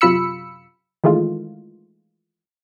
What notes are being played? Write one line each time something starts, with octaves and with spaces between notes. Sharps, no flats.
F#2 C3 F4 B5 E6 C#7
D#3 E3 G#3 A3 F4